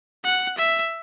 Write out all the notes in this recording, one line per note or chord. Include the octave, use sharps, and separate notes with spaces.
F#5
E5